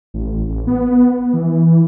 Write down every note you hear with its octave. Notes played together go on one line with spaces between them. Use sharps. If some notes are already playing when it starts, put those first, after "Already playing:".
A1
A1
B3
E3